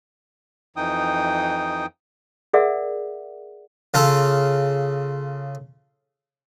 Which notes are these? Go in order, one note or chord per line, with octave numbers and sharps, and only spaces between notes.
F2 E3 D#4 G5 D#6
G#4 A#4 D5 E5 F#5
C#3 F4 A4